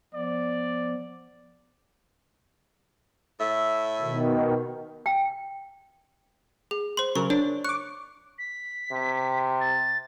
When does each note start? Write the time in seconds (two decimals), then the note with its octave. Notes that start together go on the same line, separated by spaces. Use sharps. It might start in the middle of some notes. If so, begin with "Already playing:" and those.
0.14 F3 B3 D5
3.39 A2 E5
4.00 B2 D#3
5.06 G5
6.71 G#4
6.97 C5 C6
7.16 C#3 F#3 A#4 C#6
7.30 D4 C#5
7.64 C#6 D6 F#6
8.39 B6
8.92 C3
9.60 A6